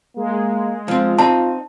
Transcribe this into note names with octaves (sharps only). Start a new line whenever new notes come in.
G#3 A#3
F3 C4 F4
C4 D#4 A5